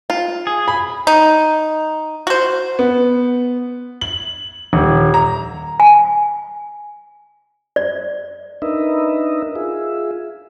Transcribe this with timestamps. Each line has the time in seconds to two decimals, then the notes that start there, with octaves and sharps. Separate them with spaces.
0.10 F4
0.47 G#4
0.68 B5
1.07 D#4
2.27 F#4 C5
2.79 B3
4.01 F#7
4.73 D#1
5.14 A#5
5.80 G#5
7.76 D5
8.62 D4 D#4 A#4 B4 D#5 E5
9.56 F4 G#4 E5